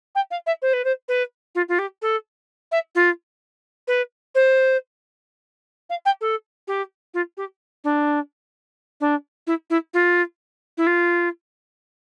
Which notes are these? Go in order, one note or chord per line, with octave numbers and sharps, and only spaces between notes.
G5
F5
E5
C5
B4
C5
B4
F4
F4
G4
A4
E5
F4
B4
C5
F5
G5
A4
G4
F4
G4
D4
D4
E4
E4
F4
E4
F4